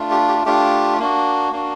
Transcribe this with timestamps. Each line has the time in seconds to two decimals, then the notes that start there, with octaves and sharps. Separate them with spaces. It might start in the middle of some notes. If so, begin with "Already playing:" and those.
Already playing: A3 D4 F4
0.11 G4
0.28 G4
0.46 A3 D4 F4 G4
0.99 A#3 D4 F#4
1.52 A#3 D4 F#4